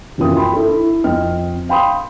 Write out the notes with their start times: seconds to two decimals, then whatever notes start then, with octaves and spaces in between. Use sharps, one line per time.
0.18 D#1 F#2 E3 C4 F4 D#6
0.37 G5 B5 C6
0.54 E4 A4
0.68 E4
1.04 F2 C4 D#5 F6
1.69 F5 G5 B5 C6 D#6